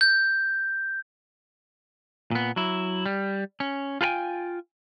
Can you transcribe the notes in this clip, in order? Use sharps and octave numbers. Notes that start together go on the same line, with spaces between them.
G6
A#2 B3
F#3 E4
G3
C#4
F4 G#4 B4 G5 G#5